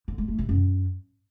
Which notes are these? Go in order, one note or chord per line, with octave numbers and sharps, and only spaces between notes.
D3
G#3
A3
C3
F#2